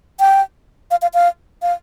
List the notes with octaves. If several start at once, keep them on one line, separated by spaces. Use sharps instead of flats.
G5
F5
F5
F5
F5